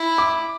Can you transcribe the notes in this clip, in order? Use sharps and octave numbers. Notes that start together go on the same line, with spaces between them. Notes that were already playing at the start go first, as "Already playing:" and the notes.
Already playing: E4
D6